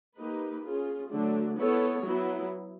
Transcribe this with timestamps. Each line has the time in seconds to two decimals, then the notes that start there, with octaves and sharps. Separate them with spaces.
0.18 A#3 D#4 G4 B4
0.65 C#4 F4 G#4
1.11 D3 F#3 A3 D4
1.58 B3 E4 A4 C#5
2.06 F#3 B3 E4